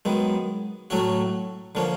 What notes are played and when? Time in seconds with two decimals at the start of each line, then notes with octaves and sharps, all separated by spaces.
0.05 F#2 D#3 G#3 B3
0.90 A2 F#3 A3 C#4 F#4
1.75 D3 F3 A#3 C#4